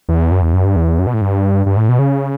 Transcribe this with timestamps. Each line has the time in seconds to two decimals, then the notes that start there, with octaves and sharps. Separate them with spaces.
0.09 E2
0.31 F#2
0.42 E2
0.53 F#2
0.65 G2
0.76 E2
0.99 F#2
1.07 B2
1.14 A2
1.21 G2
1.66 G2
1.77 A2
1.89 B2
1.99 C#3